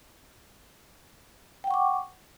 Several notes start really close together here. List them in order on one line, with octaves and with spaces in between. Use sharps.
G5 F#5 C#6 D6